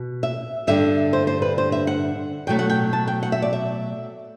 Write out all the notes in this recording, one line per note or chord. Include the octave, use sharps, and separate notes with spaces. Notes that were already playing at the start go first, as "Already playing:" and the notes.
Already playing: B2
E5
G2 D3 G3 E5
C5
C5
B4
C5
E5
F#5
B2 F#3 A3 G5
F#5
G5
A5
G5
F#5
E5
D5
E5